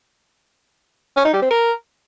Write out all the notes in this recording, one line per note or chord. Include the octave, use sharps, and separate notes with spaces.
C#4
D#4
G3
C4
A#4